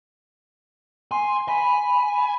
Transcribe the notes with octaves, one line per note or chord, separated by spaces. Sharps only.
G#5 C6
G#5 B5